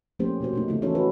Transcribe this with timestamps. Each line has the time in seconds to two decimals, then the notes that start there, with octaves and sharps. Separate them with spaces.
0.19 F3 A3 A#3 C#4 G4 C5
0.40 B2 A#3 F#4 C5
0.53 B2 A3 D#4
0.68 C#3 A3 C#4 F4
0.82 E3 C#4 D#4 F#4 A4 C#5
0.95 F#4 B4